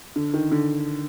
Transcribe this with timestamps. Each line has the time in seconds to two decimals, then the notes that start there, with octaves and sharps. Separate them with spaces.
0.16 D3
0.34 D#3
0.52 D3